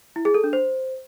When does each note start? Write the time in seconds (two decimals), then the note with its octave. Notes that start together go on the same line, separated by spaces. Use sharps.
0.16 E4
0.25 G#4
0.34 A4
0.44 D4
0.53 C5